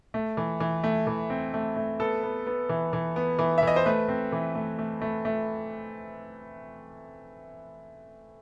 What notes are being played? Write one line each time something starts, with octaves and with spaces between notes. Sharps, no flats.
A3
E3
E3
A3
E3
C4
A3
A3
B3 A4
B3
B3
E3
E3
B3
E3
E5
E3 D#5
C5
A3 B4
C4
E3
A3
A3
A3
A3